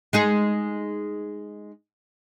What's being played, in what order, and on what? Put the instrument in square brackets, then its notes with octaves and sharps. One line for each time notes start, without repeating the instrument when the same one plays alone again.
[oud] G#3 D#4 G#4